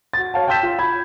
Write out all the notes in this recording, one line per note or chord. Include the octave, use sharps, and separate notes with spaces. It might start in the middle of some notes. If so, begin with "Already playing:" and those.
F#4 A6
C#5 F5 A5
G5 A5 E6 G6 B6 E7
F4
B5 G#6